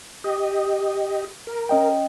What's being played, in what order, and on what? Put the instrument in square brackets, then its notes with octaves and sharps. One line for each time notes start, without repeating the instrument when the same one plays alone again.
[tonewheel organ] G4 D#5
A#4
[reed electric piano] C#4 D#5 G5